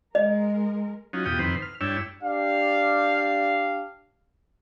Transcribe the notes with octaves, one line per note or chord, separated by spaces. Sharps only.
G#3 A#4 D#5
F#3 C#4 D#4 F4
E2 B2 F4 G4 G5 D#6
F2 C3 D#3 B4 C5
F6
G2 D4 E4 C#5 G5 E6
D4 G4 F5